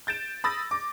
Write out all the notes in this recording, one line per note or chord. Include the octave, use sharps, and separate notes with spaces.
G6 A6 D7 E7
B5 D#6 E6 A6 A#6
D6